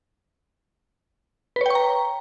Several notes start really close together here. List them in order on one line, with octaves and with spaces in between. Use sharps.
B4 C#5 G5 C#6 A#5